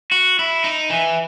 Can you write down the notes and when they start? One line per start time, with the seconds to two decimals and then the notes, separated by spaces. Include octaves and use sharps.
0.12 F#4
0.39 E4
0.64 D#4
0.90 E3